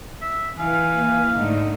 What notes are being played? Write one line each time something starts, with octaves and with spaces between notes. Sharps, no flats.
E5
E3 B4 F5 G#5
A#3
G#2 D3 A3 D#4